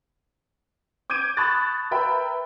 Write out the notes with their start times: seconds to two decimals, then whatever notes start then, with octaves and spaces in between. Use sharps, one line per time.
1.10 D6 G6 G#6 D7 D#7
1.37 A5 B5 C#6 D#6 F#6 A6
1.91 A#4 B4 E5 G5 B5